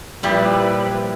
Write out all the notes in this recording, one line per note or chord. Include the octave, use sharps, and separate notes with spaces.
A#2 F3 G3 E4 G4 B4